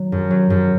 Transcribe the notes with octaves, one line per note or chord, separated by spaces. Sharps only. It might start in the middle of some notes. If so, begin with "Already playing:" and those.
Already playing: D#3 F#3
F#2
F#3
F#2